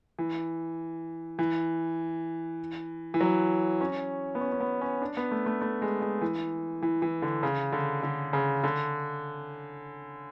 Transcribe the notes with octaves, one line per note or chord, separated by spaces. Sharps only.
E3
E3
E3
F#3
C#4
B3
C#4
C#4
B3
C#4
D4
B3
A3
A3
A3
G#3
G#3
E3
E3
E3
D3
C#3
D3
D3
C#3
D3